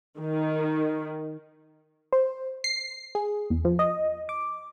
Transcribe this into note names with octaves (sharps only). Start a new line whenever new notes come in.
D#3
C5
C7
G#4
E2
F3
D#5
D6